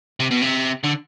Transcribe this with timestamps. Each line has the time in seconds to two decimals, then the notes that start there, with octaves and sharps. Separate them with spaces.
0.20 C3
0.31 B2
0.42 C3
0.84 D3